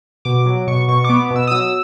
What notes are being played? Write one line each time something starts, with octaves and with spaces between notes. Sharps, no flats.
B2 D6
F#3
B2 C#6
B2 C#6
B3 D6
B2
E6
D#6
F#3 E6